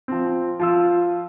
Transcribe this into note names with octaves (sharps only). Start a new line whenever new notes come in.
F3 C4
F3 F4 E6